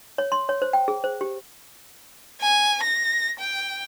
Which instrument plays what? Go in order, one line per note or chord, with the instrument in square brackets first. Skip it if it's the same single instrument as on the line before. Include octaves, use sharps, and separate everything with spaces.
[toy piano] C#5
C6
C#5
C5
G5
G#4
C5
G4
[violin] G#5
A#6
G5